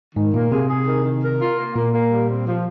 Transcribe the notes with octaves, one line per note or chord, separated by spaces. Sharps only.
G#2 D#3
A#2 A#3
C3 G#4
G#4
D#3
D#3
A#4
F4
A#3
A#2 A#3
A#3
G3
C4
F3